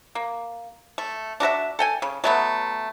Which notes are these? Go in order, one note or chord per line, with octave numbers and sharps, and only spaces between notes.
A#3
A3
D4 F#4 A#4 E5
A4 G5 G#5
C#3
F#3 A3 B3